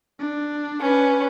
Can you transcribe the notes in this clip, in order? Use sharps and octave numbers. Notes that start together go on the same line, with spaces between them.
D4
C#4 B4